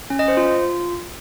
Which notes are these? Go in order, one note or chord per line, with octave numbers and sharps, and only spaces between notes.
C#4
D#5
C5
F4